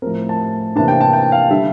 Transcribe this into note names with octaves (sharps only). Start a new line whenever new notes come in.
A2 F3 C4 A#4
A5
C3 E3 A#3 D4 A5
G5
A5
G5
F5
D3 G3 D4 E5